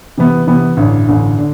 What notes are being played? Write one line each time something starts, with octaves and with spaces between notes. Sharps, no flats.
C3 E3 B3
C3 E3 B3
A1 G2 D3
A1 G2 D3
D3